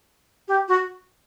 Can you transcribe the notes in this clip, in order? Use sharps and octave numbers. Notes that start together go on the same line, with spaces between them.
G4
F#4